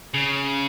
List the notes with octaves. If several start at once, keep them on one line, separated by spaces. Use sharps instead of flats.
C#3